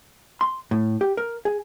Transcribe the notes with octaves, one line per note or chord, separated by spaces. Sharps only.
C6
A2
G4
A#4
G#4